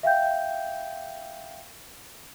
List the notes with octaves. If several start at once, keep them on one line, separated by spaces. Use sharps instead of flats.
E5 F5 G5 G6